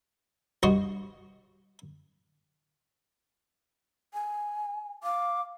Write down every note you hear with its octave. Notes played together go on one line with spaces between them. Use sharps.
G2 F#4 D#5 C6 C#6
G#5
F5 D6